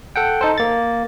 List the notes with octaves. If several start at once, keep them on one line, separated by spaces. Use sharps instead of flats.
A4 F#5 G5
D#4 A4 C5
A#3 A6